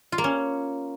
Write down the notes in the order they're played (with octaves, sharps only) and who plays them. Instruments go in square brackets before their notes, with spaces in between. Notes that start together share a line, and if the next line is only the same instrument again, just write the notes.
[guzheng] F4
A#3
C#4